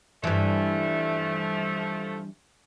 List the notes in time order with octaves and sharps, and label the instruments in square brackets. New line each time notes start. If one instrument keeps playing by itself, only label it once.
[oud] G2 E3 [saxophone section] F3 A3